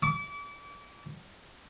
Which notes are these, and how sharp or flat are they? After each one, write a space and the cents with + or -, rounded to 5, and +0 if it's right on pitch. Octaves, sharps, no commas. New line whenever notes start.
D6 -35